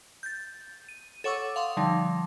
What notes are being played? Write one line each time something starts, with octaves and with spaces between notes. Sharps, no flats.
G6 A6
D#7
A4 C#5 F#5 C#6 D6 E6
F5 F#5 C6 D#6
D3 F3 G3 D#4